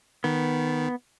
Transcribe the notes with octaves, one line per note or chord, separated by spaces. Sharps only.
D#3 B3